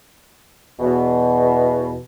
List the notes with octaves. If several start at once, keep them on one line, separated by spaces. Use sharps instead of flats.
E2 B2